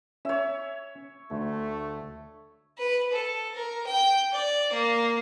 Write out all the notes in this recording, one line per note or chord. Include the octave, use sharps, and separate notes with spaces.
C#4 C#5 E5
D2 A3
B4
A4
A#4
G5
D5
A#3